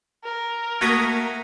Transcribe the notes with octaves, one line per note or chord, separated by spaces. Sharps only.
A#4
A3 A#3 F#4 D#6 G#6 A#6 B6